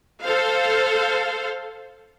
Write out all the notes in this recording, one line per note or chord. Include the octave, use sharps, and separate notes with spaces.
A4 C5 F5